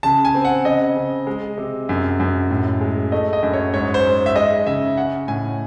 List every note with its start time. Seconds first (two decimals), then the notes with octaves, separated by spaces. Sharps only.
0.03 C#3 A5
0.25 G#5
0.34 C4
0.45 F#5
0.65 C#3 D#5
0.96 C#3
1.27 G#3
1.58 C3
1.89 F#2
2.20 F#2
2.51 A2
2.81 G#3
3.12 A3 D#5
3.33 D#5
3.43 F#2
3.54 C#5
3.73 G#2 C#5
3.94 C5
4.05 G#2
4.26 E5
4.36 G#3 D#5
4.66 C#3 E5
4.97 C#4 F#5
5.28 A2 G#5